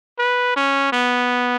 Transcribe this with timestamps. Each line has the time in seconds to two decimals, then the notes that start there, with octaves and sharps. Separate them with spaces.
0.19 B4
0.56 C#4
0.93 B3